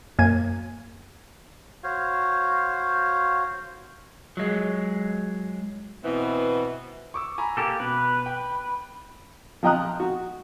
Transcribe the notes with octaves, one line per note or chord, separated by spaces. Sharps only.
F#2 A#3 G#5 G#6 D#7
F#4 C5 C#5 F5
F#3 G#3
B2 E3 B3 C4
C#6 D6 E6
G#5 A#5 B5
A#3 G4 A4
B2 B4
G5
F3 D#5 G5 A#5 D#6 F#6
F#4